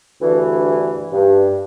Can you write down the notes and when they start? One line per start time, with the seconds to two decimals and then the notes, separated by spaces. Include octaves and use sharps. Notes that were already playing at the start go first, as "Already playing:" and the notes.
0.21 D2 G2 D3 E3
1.12 G2